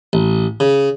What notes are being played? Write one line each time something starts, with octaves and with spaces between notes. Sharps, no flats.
A1
C#3